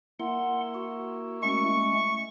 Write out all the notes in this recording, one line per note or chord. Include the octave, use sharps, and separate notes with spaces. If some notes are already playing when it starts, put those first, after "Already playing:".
A#3 E4 F#5 C6
F#4
G#3 A3 C#4 C#6